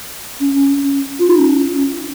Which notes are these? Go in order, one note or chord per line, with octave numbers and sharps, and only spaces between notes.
C#4
F4
D#4
C#4